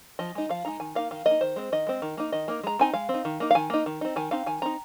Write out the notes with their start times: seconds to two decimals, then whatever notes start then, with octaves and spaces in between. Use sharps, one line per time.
0.19 F3 D#5
0.35 G#3 D#4
0.49 F3 F5
0.65 G#3 D#4 A#5
0.80 D#3 G#5
0.95 A#3 D#4 F5
1.11 D#3 F5
1.26 A#3 D#5
1.31 D#4
1.41 D#3 C5
1.56 G#3 C4
1.72 D#3 D#5
1.87 G#3 C4
2.02 D#3
2.17 A#3 D#4
2.32 D#3 D#5
2.48 A#3 D#4
2.64 G#3 A#5
2.79 C4 D#4 G#5
2.94 G#3 F5
3.09 C4
3.14 D#4
3.25 D#3
3.40 A#3 D#4
3.51 F5
3.55 D#3 G#5
3.70 A#3 D#4
3.86 D#3
4.01 C4 D#4
4.16 D#3 G#5
4.31 C4 D#4 F5
4.46 D#3 G#5
4.62 C4 D#4 A#5